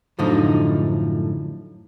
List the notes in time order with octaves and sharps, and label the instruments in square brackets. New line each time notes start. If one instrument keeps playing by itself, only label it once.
[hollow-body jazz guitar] F#2 A2 D3 F3 D#4